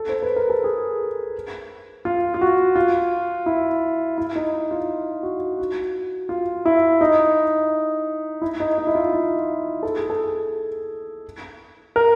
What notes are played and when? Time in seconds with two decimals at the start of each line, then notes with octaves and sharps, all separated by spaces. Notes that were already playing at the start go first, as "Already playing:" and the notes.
Already playing: A4
0.09 C5
0.22 B4
0.36 A#4
0.50 A4
0.64 G#4
2.05 F4
2.34 F4
2.41 F#4
2.76 F4
3.46 E4
4.18 E4
4.35 D#4
4.71 F4
5.23 F#4
5.58 F#4
6.29 F4
6.65 E4
7.01 D#4
8.42 E4
8.60 D#4
8.78 D#4
8.87 E4
8.95 F4
9.13 F4
9.83 A4
9.97 G#4
10.10 A4
11.96 A#4